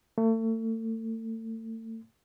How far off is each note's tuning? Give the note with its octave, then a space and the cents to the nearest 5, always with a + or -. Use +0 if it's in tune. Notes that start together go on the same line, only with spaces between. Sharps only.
A3 +35